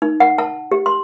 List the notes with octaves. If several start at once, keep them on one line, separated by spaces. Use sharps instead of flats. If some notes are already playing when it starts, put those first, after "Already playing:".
D#4
F#5
A5
G4
C6